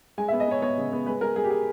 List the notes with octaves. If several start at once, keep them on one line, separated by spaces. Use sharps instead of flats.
G#3 G#5
E5
B3
D#5
B3 C#5
B3 C#5
C#3
B3
G#3 B4
G#3 A#4
G#3 G#4
G4
G#4